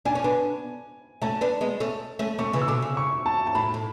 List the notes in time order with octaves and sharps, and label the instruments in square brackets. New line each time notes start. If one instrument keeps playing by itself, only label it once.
[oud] D4 [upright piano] G#5
[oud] C#4
B3 D4
[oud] A3 C#4 [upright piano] A5
[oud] B3 D4
G#3 B3
A3 C#4
A3 C#4
[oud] A3 C#4 [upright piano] C#6
[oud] C#3 E3
[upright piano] E6
[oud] B2 D3 [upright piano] D6
[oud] C#3
[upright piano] C#6
A5
A5
[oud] A2 [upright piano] B5
[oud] A2